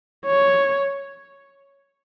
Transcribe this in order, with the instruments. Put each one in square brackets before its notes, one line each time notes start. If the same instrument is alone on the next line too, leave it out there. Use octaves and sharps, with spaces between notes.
[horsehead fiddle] C#5